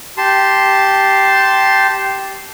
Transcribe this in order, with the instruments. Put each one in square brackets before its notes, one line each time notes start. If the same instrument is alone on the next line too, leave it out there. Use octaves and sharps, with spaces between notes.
[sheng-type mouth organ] G4 A5 C6